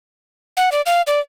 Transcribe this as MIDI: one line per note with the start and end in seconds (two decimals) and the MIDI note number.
0.57 0.69 78
0.72 0.81 74
0.86 1.02 77
1.07 1.20 74